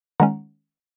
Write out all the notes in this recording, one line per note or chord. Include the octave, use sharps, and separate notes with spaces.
D#3 G#3 C#4 F#5 A#5